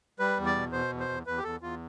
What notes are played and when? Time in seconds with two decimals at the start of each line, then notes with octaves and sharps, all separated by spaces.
0.19 G3 B4
0.37 E2
0.46 D5
0.55 B2
0.72 B2 C5
0.91 E2
1.00 C5
1.09 E2
1.27 E2 B4
1.38 G4
1.44 E2 A4
1.61 E2 F4